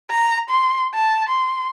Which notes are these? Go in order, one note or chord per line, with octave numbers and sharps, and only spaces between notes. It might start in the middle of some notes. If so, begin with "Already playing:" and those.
A#5
C6
A5
C6